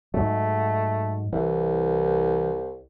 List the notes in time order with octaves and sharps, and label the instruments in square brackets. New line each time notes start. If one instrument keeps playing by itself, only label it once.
[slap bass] G#2 F#3 [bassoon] A3
[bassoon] C2 [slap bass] E3